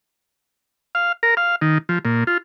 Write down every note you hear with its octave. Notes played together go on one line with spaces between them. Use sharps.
F5
A#4
F5
D#3
F3
A#2
F4